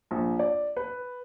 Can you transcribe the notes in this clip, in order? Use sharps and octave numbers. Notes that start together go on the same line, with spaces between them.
A#1
D5
B4